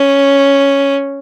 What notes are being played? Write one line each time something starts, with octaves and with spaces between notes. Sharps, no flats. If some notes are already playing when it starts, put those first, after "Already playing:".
Already playing: C#4